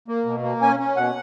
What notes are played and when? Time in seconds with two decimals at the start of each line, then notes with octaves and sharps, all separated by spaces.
0.08 A#3
0.26 B2
0.43 A#3
0.61 C#4 G#5
0.79 C#4
0.96 B2 F#5